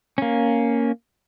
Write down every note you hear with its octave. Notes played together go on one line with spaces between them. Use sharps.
A#3 C#4